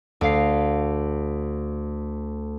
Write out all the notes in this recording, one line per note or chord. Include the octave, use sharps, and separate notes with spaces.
D2 F5 C7